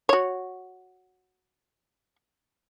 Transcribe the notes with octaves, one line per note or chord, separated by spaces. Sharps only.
F#4 C#5